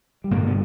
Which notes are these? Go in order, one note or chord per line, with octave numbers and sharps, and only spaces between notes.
G3
G1 G2 A#2 D3 A#3
B2 B3